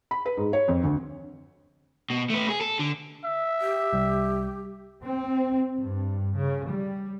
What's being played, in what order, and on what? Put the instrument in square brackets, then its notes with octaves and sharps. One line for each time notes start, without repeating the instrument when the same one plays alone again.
[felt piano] B5
B4
G#2
C#5
F2
D2
[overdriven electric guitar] B2
A3 B4
G#4
A4
D3
[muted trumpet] E5
[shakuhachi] G4
[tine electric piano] C2 G3
[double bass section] C4
G2
C#3
G3